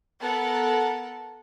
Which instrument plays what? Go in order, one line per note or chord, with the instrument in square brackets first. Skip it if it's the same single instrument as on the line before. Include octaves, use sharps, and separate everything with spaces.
[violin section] B3 A4 A#4 F#5 A5